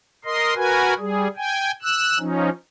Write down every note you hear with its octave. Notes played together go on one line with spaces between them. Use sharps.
A#4 D#5 C6
F#4 A#4 B4 G#5
G3 G#4
G5 G#5
E6 F#6
F3 C#4 D#4